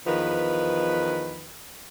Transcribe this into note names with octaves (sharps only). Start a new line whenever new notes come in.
E2 D#3 F3 B4